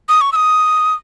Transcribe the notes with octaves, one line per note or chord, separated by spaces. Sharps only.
D#6
C#6
E6
D#6